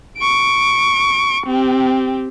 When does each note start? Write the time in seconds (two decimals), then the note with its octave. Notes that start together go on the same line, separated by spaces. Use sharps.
0.18 C#6 D7
1.47 C4 G4